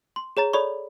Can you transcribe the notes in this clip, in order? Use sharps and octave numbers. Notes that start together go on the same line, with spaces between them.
C6
G#4 C#5 A#5 A6
A4 C#5 D5 B5 C#6